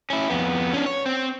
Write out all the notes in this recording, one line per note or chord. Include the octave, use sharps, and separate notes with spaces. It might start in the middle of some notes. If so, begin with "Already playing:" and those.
C#4 E4
F2 B3
C#4 D4
C#5
C4